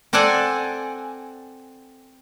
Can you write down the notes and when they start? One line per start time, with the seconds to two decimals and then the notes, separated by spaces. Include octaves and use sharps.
0.13 C4 A4 D5 F#5 G#5